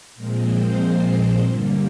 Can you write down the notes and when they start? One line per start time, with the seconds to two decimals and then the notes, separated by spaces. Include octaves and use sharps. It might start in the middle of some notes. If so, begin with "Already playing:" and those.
0.15 A#2 F3 G#3 C4 A#4
0.46 C5
1.37 G2 D3 G3 A#3